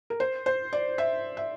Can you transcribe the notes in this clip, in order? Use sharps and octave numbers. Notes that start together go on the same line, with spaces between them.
A#4
C5
C5
D5
E5
E5